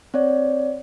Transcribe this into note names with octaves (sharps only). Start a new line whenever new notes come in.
C4 C#5 D5